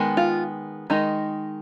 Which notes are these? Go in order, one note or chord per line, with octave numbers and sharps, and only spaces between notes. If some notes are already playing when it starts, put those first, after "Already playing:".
Already playing: D#3 G#3 B3
F4
D#3 G#3 D#4